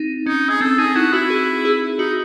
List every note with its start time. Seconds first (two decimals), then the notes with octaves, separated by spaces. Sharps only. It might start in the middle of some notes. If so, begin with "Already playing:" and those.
Already playing: C4 D#4
0.26 C#4 D#4
0.49 G#4
0.61 C4 A4
0.78 D#4 G#4
0.95 E4 F#4
1.13 E4 F#4
1.30 G#4
1.65 G#4
1.99 D#4 F#4